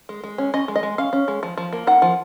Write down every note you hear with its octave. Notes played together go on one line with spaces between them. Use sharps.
G#3
G#3
C#4
C#4 D#5
G#3
D#5
G#3
C#4 F5
C#4
G#3
F3
F3
A#3
D#4 F#5
F3